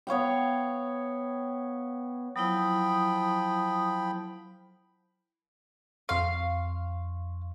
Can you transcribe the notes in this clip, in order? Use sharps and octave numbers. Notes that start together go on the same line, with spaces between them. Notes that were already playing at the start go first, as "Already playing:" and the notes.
B3 C#5 F5 G5
F3 F#3 E4 G5 B5 D#6
F2 F5 C6 C#6